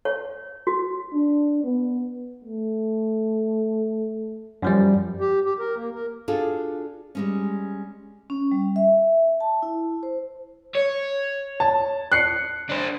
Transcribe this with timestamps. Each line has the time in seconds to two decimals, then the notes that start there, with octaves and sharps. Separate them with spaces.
0.05 C#5
0.67 F#4
1.13 D4
1.64 B3
2.45 A3
4.62 F#2 F3 G3
5.20 G4
5.45 G4
5.59 A#4
5.76 A#3
5.94 A#4
6.28 D4 F4 F#4 G#4 A4
7.15 G3 G#3 C#4
8.30 C#4
8.52 G3
8.76 E5
9.41 A5
9.63 E4
10.03 C5
10.75 C#5
11.60 A5
12.12 F#6 C7 C#7
12.69 D4 C5